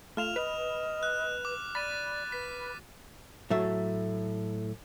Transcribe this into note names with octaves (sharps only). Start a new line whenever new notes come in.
A3 F4 F6 E7 F7
B4 D#5
F#6
D6
D5 B5 A6 D#7
B4 B6
A2 F#3 A3 E5